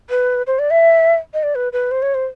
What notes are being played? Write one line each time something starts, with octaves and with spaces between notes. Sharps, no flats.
B4
C5
D5
E5
D#5
D5
B4
B4
C5
C#5
C5